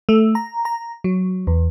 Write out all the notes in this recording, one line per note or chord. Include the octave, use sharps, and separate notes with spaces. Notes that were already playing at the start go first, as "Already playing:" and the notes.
A3
A#5
A#5
F#3
E2